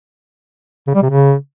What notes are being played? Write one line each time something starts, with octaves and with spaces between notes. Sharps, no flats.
C#3
G3
C3
C#3